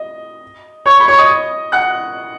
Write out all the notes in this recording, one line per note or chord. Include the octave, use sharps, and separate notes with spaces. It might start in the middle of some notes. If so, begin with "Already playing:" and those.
Already playing: D#5
C#5 C#6
B5
C#5 C#6
D#5 D#6
F#5 F#6